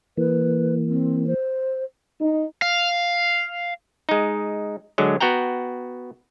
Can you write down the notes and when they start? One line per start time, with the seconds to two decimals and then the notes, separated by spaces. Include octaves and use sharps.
0.18 E3 A#3 B4
0.89 C4
1.27 C5
2.21 D#4
2.62 F5
4.09 G#3 D#4
4.98 D3 F#3 G#3
5.20 B3 F#4 F#5 G5 A#5